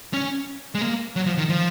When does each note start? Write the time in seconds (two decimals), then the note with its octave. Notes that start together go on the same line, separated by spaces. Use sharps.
0.14 C#4
0.75 G#3
0.81 A#3
1.16 F#3
1.26 F3
1.38 D#3
1.49 F3